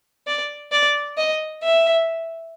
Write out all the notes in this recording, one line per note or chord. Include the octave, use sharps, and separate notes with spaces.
D5
D5
D#5
E5